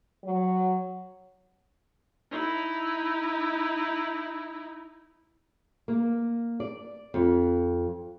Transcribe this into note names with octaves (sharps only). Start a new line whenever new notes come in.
F#3
D#4 E4
A#3
D5
F2